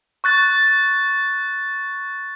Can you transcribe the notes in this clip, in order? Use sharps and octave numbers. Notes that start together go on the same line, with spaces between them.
C#6 F#6 A6